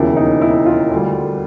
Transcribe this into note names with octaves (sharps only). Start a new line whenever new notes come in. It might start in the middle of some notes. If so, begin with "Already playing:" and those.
Already playing: E1 D#2 C#3 F3 E4
D#4
E4
F4
D2 D3 G3